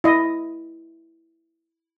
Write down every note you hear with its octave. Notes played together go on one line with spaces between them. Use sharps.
E4 D#5